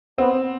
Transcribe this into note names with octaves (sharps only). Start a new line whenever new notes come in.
B3 C4